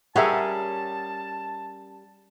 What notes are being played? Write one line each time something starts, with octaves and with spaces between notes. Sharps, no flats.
G3 C#4 G#4 A#4 E5 F#5 A5